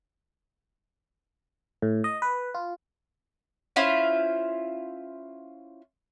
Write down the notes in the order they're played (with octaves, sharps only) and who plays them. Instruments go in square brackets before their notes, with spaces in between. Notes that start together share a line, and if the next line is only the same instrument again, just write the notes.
[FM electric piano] A2
D#5
B4
F4
[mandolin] C#4 E4 F4 C5